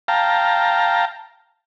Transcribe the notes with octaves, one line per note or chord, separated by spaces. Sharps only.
F5 G5 A5 A#5